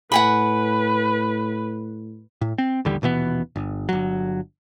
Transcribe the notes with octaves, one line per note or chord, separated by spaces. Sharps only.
A2 B4 F#5 G#5 B5
A2
C4
A1 D#2 D3 G3
D#1 B2 E3 B3
G1
G1 F#3